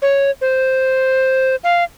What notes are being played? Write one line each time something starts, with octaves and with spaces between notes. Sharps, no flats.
C#5
C5
F5